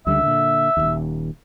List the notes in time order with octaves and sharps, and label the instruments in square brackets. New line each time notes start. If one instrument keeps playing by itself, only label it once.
[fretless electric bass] C#2 D3 G3 [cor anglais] E5
[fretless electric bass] A#2 D3
D#1 G#1 D#2